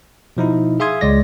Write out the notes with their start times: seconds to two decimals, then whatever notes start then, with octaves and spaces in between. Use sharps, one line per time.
0.37 B2 F3 D#4 E4
0.80 G#4 E5 F5 C6 D#6 G#6
1.01 C#2 G#3 D5 A#6